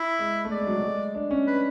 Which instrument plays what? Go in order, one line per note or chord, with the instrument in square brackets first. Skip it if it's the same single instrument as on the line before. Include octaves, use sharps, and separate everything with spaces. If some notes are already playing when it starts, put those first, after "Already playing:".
Already playing: [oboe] E4
[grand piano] G#3
A3
[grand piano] G#3 [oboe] D5
[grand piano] G#3
F#3
F#3
G#3
D4
C#4
[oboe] B4